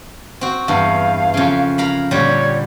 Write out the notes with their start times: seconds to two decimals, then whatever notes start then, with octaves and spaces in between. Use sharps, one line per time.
0.41 C4 F#4
0.68 E2 G2 F5
1.34 F2 C#3
1.78 A#4 F5 B5
2.11 A#2 D3 G3 C#5